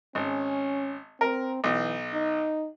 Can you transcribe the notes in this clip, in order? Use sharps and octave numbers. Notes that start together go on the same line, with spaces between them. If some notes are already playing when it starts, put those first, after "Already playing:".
G#1 C#4
C4 A#4
B1 E3
D#4